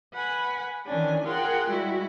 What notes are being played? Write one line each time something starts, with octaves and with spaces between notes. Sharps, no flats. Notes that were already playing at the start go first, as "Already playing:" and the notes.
B4 F#5 G#5 B5
D#3 E3 C#4 D4 G#5
F4 G#4 A#4 F#5 G5 C6
G3 G#3 E4 F#4